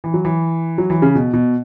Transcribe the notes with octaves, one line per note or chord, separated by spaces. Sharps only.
E3
F#3
E3
F#3
E3
C#3
B2
B2